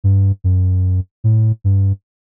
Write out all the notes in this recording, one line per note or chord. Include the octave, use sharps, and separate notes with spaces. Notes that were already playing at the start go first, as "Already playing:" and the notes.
G2
F#2
A2
G2